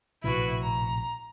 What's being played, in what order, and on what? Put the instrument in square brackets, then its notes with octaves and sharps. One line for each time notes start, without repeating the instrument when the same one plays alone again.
[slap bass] A#1 A2 C3 [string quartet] E4 F#4 B4
[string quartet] A#5